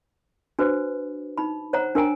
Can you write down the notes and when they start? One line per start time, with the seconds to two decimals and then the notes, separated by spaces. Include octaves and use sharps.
0.59 D4 F#4 B4 C5
1.38 D#4 B5
1.73 C5 C#5 F#5 A#5
1.95 D4 A#4 G5 G#5 A#5